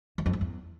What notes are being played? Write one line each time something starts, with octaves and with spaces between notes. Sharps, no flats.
E2
F2
G2
E2